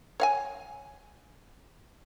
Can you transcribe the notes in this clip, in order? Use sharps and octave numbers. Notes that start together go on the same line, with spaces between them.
C#5 F5 G#5